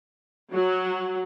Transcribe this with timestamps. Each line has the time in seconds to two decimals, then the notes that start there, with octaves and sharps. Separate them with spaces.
0.52 F#3